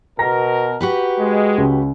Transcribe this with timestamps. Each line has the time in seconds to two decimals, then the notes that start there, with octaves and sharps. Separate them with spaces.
0.19 B2 A#4 A#5 A#6
0.81 F#4 G4 B4
1.20 G#3
1.58 C#2